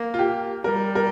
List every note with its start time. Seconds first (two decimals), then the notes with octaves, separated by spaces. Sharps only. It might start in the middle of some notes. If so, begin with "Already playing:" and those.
Already playing: A#3
0.14 F4
0.19 G4
0.64 G3 A#4
0.95 A#4